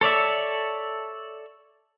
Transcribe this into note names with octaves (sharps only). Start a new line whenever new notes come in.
A4 C#5 D5 E5